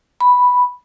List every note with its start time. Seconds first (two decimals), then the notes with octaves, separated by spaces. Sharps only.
0.21 B5